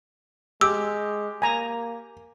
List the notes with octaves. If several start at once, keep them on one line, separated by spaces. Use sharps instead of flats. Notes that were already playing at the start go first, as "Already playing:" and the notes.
G#3 G4 E6
A#3 G#5 A#5